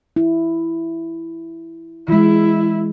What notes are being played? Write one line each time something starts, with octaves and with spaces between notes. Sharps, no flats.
E4
E3 G#3 E4